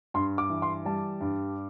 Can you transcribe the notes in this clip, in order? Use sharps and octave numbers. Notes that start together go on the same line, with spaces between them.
G2 C6
D6
E3
C6
G3 A5
G2